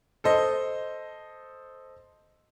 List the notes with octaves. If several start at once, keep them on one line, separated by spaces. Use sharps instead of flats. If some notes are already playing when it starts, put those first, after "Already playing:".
A4 C5 D#5